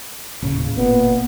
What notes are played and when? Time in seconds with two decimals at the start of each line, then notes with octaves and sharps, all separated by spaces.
0.42 D#1 A2 C#3
0.77 F#1 A#2 B3